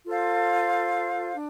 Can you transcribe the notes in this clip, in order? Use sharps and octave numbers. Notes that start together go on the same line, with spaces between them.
F4 A4 C5 F5
D4